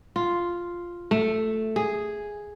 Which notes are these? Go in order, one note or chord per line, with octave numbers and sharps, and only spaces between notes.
F4
A3
G#4